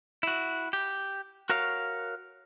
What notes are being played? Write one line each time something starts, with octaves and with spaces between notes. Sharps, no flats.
E4 F#4
G4
F#4 A#4 C#5 F5